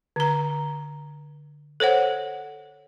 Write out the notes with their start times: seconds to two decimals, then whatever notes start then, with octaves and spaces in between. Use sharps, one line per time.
0.16 D3 A#5
1.80 A4 C5 C#5 F#5